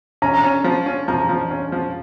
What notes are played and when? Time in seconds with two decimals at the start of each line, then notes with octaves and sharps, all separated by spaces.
0.22 C#4 A#5
0.44 C#4
0.64 F3
0.86 C#4
1.08 F3 A#5
1.29 F3
1.51 C#4
1.72 F3